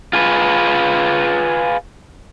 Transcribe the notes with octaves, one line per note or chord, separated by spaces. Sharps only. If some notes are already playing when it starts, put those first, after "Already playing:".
F4 G#4 B4